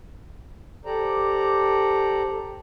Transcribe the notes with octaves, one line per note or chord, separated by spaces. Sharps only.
G4 A4 C5 D5 A#5